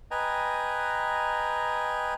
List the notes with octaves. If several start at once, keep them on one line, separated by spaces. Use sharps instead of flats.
B4 D#5 G5 G#5 A#5